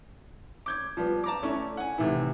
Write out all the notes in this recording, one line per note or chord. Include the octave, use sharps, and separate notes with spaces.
D6 G6 G#6
F3 G3 B3
A5 A#5 D6
A3 C#4 D4 E4
F#5 G#5
A2 C3 D#3 E3 E4